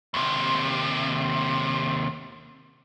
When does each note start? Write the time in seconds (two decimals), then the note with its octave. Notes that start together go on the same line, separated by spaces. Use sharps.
0.14 D#2 C3